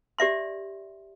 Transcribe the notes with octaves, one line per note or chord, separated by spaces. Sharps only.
G4 D5 E5 C6